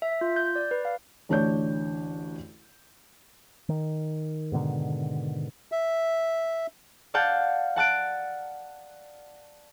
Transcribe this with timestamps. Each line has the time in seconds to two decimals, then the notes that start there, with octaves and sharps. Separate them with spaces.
0.02 E5
0.21 F4
0.36 G6
0.56 D5
0.71 B4
0.85 F5
1.29 A1 D2 D4 C#5 D5 G6
3.69 D#3
4.52 G#2 B2 D3 D#3
5.72 E5
7.14 D5 F5 F#5 A5 G6
7.76 F#5 A5 F#6 D7